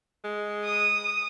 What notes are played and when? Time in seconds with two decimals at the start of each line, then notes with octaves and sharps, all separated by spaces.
0.24 G#3
0.64 D#6